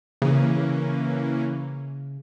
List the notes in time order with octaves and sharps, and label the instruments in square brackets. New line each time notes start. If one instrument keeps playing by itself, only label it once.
[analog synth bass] C#3 [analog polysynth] E3 A#3 C#4